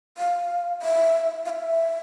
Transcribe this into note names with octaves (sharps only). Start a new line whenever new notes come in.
F5
E5
F5
E5